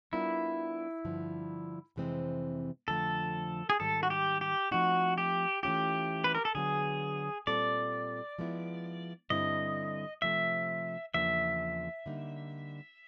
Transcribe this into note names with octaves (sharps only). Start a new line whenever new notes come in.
G3 B3 D4 E4 F4 A#4
G2 D3 F3
F2 C3 E3 G#3 C4
F2 D3 F3 A3 A4
G#4
G#2 D#3 G3 A4
F#4
G4
G4
F3 A3 C4 D#4 F#4
G4
E3 A3 C#4 F4 G4
B4
A#4
A4
D3 F#3 B3 G#4
A#2 G3 C4 F4 A4 D5
F3 G#3 B3 E4
G2 D3 G3 C4 E4 D#5
C3 F3 A3 E5
E2 C#3 F3 A#3 D4 E5
D3 G3 A#3 D#4